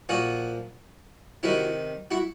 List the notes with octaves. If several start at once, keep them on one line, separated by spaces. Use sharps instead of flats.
A#2 F3 F#4 G#4
C3 D#3 E4 F#4
E4 F#4